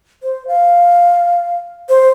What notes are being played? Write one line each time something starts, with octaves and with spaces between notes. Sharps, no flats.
C5
F5
C5